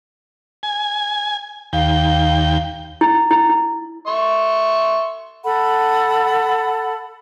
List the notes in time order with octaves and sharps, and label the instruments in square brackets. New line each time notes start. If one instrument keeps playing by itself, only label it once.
[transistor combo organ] G#5
[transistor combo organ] D#2 G5 [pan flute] F5
[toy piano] E4
E4
E4
[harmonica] E5 C6 C#6
[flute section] A4 F#5 B5